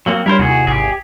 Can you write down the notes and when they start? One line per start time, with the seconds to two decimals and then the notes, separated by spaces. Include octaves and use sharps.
0.06 F#3 A#3 C4
0.26 G3 D4 E4 A#4 C5 C#5
0.39 D#2 C3 E4 F#4 G#4 G#6
0.67 G#1 G4 G#4